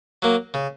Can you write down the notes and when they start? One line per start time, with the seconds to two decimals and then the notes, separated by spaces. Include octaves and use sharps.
0.22 F#3 A#3
0.54 C#3